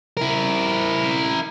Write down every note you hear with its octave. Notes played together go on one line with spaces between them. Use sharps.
E4 A#4